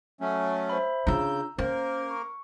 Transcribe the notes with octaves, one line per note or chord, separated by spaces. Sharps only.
F#3 A3 C#4
C5 E5 B5
C#3 D4 F4 A#5 E6 G6
A#3 C#4 A#4 C5
C#6